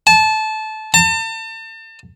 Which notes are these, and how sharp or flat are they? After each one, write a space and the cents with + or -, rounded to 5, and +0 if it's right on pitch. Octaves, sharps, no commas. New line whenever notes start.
A5 -20
A5 +35